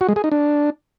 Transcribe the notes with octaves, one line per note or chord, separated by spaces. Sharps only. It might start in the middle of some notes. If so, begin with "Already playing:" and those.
F#4
G#3
G#4
D#4
D4